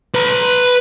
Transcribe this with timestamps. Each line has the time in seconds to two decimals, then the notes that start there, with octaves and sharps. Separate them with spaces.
0.15 B4 A#5